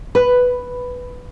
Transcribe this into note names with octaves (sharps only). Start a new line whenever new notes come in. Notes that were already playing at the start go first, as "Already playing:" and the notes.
B4